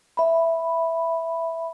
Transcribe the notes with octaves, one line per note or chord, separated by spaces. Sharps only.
E5 B5